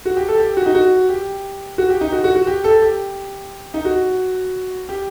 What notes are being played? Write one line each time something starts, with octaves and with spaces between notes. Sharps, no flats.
F#4
G4
A4
G4
F#4
D#4
F#4
G4
F#4
G4
D#4
F#4
F#4
F#4
G4
A4
G4
D#4
F#4
G4